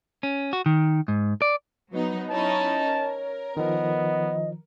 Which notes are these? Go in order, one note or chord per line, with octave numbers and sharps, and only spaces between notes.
C#4
F#4
D#3
G#2
D5
F#3 B3 D#4 B4
C#4 D#4 E4 C#5 A5
A#4
D#3 F3 B3 D#5